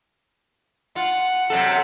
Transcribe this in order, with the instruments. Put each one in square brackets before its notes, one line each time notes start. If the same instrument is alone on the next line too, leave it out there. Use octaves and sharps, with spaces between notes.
[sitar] F4 [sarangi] F#5
[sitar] F#2 C3 A4